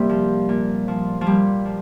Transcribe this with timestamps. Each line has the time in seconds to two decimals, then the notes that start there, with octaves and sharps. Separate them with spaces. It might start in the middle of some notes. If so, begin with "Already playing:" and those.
Already playing: C3 G3 A#3
0.09 F3
0.49 A#2
0.88 F3
1.21 F3
1.27 A#2 G3
1.65 F3